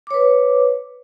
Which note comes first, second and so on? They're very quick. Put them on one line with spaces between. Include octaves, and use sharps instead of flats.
D6 C#5 B4